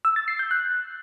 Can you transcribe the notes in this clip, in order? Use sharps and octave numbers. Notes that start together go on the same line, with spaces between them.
E6
A6
C7
G6
F#6